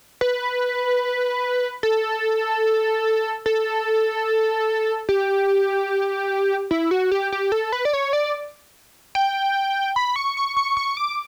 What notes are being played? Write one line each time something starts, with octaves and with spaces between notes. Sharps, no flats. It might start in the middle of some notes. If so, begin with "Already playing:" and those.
B4
A4
A4
G4
E4
F#4
G4
G4
A4
B4
D5
C#5
D5
G5
B5
C#6
C#6
C#6
C#6
D6